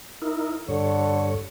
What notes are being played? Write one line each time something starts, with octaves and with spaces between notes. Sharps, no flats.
D#4 E4 A#4
G2 D3 C#5